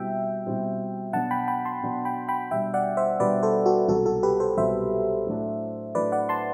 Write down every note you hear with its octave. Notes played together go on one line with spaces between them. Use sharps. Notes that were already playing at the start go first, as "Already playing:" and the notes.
Already playing: B2 G3 C4 E4 E5 G5
B2 G3 C4 E4
B2 F#3 B3 D4 F#5 A5
G5 B5
G5 B5
A5 C6
B2 F#3 B3 D4
G5 B5
G5 B5
B2 G3 D4 E5 G5
D5 F#5
C5 E5
B2 G3 D4 B4 D5
A4 C5
F#4 A4
C2 B2 F#3 F#4 A4
F#4 A4
G4 B4
A4 C5
C2 B2 F#3 C5 E5
A2 F#3 A3 D4
A2 F#3 A3 D4 B4 D5
D5 F#5
A5 C6